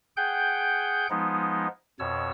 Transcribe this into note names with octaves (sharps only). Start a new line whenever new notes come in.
G#4 F#5 G5 G6
F3 G#3 B3 D#4
F2 B2 C#5 E6